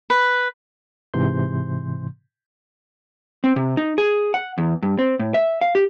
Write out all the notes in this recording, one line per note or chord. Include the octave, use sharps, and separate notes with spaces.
B4
G#2 C3 E3 C6 G6
C4
C3
D#4
G#4
F#5
E2
G2
C4
A2
E5
F5
G4